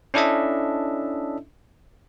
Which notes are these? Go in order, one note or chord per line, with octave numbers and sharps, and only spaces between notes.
C#4 D4 E4 A4 D#5 E5